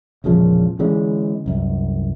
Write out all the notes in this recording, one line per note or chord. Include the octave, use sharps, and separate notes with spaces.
E1 A#1 C#3 F3
D3 E3 G#3 C#4
C2 F#2